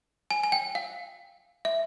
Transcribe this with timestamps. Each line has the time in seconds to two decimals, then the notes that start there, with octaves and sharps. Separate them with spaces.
0.31 G#5
0.44 G#5
0.52 G5
0.75 F5
1.65 E5